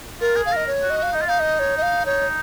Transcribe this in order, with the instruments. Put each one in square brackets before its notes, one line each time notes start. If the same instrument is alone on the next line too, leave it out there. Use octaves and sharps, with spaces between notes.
[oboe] F4 [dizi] A#4
[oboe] G#4
[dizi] F5
[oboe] A#4 [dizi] D#5
[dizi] C#5
[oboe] F#4
[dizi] D#5
[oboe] F#4
[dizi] F5
[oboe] D#4 [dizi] D#5
[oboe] F4
[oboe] D#4 [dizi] F5
[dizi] D#5
C#5
D#5
F5
[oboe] D#4 [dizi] C#5